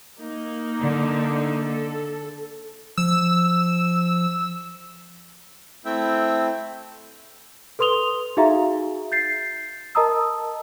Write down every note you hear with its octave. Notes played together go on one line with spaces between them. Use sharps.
A#3 D#4
D3
A4
F3 E6
A3 C4 E4 E5 G5
A4 B4 C6 D#6 F7 G7
D#4 F#4 G#4 E5 F5 A#5
G6 A6 C7
A#4 D#5 A5 A#5 D#6 E6